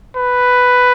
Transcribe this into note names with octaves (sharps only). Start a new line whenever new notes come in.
B4